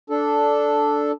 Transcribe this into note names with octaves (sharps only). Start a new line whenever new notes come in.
D4 A4